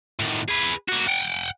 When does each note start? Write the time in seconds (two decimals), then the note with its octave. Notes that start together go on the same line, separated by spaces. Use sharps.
0.19 A2 D#3
0.48 G#4 B4
0.88 A#3 F#4
1.07 F#5 G5